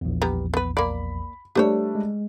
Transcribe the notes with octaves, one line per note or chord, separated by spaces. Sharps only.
A#1 E2
G3 B3 A#5
B3 B4
A#3 D5 B5
G3 A3 D4 G4 C5 C#5
G#3